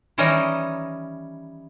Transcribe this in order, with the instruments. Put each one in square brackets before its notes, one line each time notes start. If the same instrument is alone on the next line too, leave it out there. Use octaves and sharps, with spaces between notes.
[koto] D#3 E3 G3 C#4 D#5 A#5